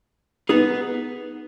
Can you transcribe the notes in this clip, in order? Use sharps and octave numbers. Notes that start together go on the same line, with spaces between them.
B3 D#4 G#4